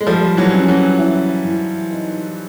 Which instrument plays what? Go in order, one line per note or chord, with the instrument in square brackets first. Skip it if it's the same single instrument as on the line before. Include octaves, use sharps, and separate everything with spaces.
[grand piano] G#3
[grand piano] F3 G3 [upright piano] A3
[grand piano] E3 F#3
[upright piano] C#4
[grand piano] E3 F#3
[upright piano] E4
E3
D#4